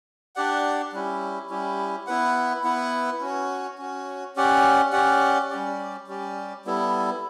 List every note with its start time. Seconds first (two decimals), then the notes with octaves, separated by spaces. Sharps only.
0.36 D4 G4 D5 F#5
0.92 G3 C#4 E4 G4
1.50 G3 C#4 E4 G4
2.07 B3 E4 B4 F#5
2.64 B3 E4 B4 F#5
3.21 C#4 F#4 C#5
3.78 C#4 F#4 C#5
4.36 C#4 G4 D5 F#5
4.92 C#4 G4 D5 F#5
5.50 G3 C#4 G4 D5
6.07 G3 C#4 G4 D5
6.65 G3 B3 E4 A4